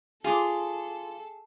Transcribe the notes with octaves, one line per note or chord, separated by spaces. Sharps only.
F4 G#4 A4 C6 D6